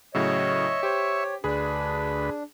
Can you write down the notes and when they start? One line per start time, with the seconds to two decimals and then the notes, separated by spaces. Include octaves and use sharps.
0.15 A2 C#3 F#3 C#5 D#5 E5 C#6
0.83 G4 C5 C#5
1.44 D2 D4 G#4 B4